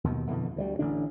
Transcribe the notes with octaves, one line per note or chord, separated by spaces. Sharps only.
D#2 B2 D#3
F2 B2 D3 E3
D2 F#3 G3
A1 D3 D4